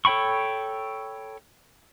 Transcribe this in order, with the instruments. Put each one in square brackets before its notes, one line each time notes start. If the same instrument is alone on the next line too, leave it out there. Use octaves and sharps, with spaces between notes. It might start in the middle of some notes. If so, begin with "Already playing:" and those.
[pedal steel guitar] A4 C#5 G5 B5 C#6